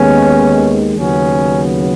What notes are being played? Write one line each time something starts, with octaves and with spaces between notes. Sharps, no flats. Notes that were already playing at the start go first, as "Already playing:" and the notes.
Already playing: D#2 D#3 G#3 B3 C#4
D#2 C#3 F#3 B3 C#4